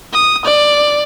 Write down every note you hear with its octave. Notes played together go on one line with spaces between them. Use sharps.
D#6
D5